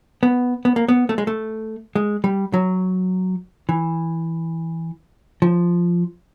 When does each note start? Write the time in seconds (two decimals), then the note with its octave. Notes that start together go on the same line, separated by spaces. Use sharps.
0.23 B3
0.65 B3
0.76 A#3
0.88 B3
1.09 A3
1.18 G#3
1.27 A3
1.96 G#3
2.24 G3
2.54 F#3
3.69 E3
5.42 F3